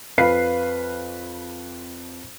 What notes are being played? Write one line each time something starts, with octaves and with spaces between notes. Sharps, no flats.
F2 B4 F5 C7